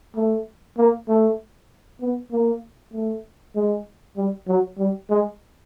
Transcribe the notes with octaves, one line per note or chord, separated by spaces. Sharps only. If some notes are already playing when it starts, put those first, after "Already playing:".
A3
A#3
A3
B3
A#3
A3
G#3
G3
F#3
G3
G#3